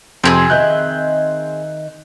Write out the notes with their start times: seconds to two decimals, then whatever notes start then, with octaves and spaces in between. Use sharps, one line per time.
0.24 F2 C3 C4 G4 G#4
0.50 D#3 D#5 E5 F#6 G6